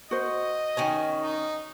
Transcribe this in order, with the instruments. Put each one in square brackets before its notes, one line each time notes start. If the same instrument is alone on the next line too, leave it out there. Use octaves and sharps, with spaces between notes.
[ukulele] F#4 C5 [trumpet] D#5
[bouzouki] D#3 C#4 G#5
[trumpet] D#4